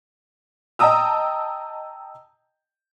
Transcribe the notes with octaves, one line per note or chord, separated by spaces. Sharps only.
D#5 G5 A5 A#5 D#6 E6